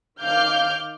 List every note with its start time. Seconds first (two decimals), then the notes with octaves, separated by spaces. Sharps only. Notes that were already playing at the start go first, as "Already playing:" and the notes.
0.21 D#3 F5 D6 F6 G6